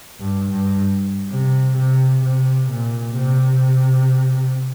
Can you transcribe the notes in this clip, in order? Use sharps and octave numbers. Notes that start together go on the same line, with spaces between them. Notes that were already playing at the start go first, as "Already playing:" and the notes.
G2
G2
C3
C3
C3
A#2
C3